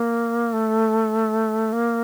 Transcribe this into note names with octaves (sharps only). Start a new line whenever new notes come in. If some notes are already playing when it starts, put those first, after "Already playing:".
Already playing: A#3
A3
A#3